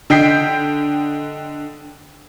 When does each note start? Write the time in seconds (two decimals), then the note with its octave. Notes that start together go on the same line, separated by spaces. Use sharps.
0.10 D3 D#5 G5 G6 B6 C7